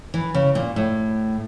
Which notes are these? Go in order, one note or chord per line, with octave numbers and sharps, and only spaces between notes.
E3
C#3
A#2
A2